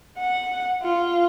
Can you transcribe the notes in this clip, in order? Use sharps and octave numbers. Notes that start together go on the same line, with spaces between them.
F#5
F4